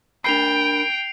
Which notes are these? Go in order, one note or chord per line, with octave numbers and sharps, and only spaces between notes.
D4 A#4 G5 B5 C7 D7 F7